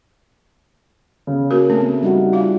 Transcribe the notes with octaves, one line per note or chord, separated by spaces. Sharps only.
C#3
A#3 F#4 A#4
A3 B3 C4
G3 D#4 F#4
F4 F5